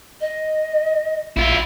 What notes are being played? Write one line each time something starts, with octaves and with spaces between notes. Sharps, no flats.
D#5
A#1 E4 F4